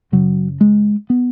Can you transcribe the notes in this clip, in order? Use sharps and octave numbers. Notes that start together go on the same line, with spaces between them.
F#2 C#3 F#3
G#3
B3